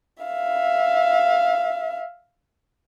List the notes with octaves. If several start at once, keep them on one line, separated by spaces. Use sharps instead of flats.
E5 F5